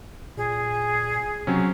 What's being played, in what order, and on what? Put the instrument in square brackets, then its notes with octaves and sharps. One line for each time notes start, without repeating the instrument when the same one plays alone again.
[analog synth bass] A#2 [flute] G#4
[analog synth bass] C3 [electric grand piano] F#3 C4 C#4